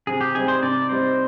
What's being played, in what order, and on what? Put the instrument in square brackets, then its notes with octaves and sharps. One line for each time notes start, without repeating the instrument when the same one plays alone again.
[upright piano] C3 [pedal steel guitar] G#4
[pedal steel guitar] G4
[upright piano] G3 C4 D#4 [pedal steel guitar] G#4
[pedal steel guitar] C5
[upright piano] C3 [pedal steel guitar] D5
[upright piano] G3 C4 D#4 [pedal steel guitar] C5